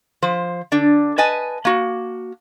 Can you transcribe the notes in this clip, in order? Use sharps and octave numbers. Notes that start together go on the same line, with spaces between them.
F3 C5
D3 D4
B4 D#5 G#5 A5
A#3 F#4